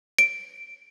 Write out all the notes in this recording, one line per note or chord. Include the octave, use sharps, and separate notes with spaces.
D7